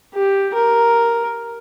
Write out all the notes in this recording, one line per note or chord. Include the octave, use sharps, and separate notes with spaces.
G4
A#4